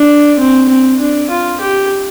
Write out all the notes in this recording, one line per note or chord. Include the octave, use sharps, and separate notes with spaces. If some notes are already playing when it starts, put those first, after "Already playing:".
Already playing: D4
C4
C4
D4
F4
G4